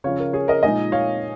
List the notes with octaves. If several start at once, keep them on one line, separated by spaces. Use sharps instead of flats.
C#3 F3 C#4 C#5 F5
A#4
G#4 C#5
A#4 D#5
A#2 F3 G#3 D#4 D#5 G#5
C#5 F5